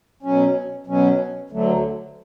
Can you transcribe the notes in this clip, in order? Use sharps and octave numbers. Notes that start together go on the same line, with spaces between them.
B2 F#3 C#4
B2 F#3 C#4
D2 D3 F#3 A3